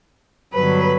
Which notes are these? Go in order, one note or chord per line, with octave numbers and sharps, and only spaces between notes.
G2 D3 F#3 B3 B4